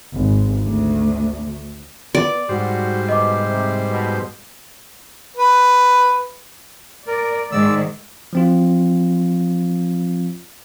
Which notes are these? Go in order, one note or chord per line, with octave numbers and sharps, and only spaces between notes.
G#1
D2
B3 D5
G#2 G3 F#4 C5
B2 D#5 D6
C3
B2
B4
A#4 D5
G#2 D#3 G#3 D5 E6
F3 C4 F4